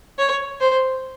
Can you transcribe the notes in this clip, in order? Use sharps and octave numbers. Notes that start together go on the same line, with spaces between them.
C#5
C5